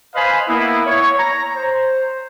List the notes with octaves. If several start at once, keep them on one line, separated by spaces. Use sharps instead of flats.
B4 C5 D#5 F5 G#5 B5
A#3 B3 E4
C#5
A#5
C5